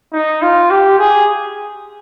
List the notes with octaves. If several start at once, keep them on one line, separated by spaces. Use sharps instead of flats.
D#4
F4
G4
G#4